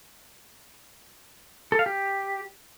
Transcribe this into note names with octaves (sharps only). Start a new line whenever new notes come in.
A4
F5
G4